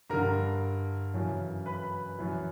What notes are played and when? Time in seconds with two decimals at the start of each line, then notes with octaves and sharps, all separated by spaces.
0.10 G2 D3 A#4 A#5
1.14 F#2 C#3 E3
1.66 B4 B5
2.19 F#2 E3